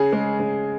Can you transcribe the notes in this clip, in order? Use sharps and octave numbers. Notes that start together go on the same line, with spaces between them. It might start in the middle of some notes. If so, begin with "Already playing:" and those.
Already playing: C#3 G#4
G#3
C#3